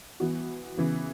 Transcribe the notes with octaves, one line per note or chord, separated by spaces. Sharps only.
E3 B3 F#4
C#3 E3 B3